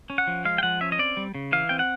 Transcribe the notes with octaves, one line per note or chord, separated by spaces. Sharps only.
C#4
F#5
F3
G#3 F5
G5
F3 F#5
C#4 E5
D#5
C4 D5
G3
C#3
E3 F5
C4 G5
F#5